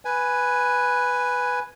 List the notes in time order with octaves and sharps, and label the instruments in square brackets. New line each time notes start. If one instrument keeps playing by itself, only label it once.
[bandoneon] B4 G#5